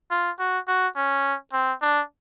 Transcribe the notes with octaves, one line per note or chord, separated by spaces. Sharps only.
F4
F#4
F#4
C#4
C4
D4